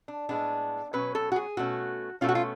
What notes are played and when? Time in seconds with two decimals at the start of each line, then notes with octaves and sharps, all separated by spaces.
0.08 D4
0.29 A2 G#3 B3 D4
0.93 B2 F#3 C#4 B4
1.15 A4
1.32 F#4
1.36 G#4
1.57 B2 A3 C#4 F#4
2.21 B2 A3 C#4 F4
2.29 F#4
2.35 F4